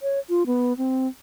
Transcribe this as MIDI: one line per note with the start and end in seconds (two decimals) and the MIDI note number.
0.02 0.19 73
0.29 0.43 65
0.46 0.76 59
0.77 1.07 60